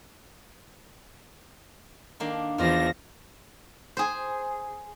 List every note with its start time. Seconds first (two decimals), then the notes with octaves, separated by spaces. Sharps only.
2.20 D#3 A#3 D4
2.58 E2 D#3 F3 F4 D5 A#6
3.97 G#4 C5